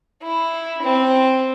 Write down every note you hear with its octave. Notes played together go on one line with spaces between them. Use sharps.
E4
C4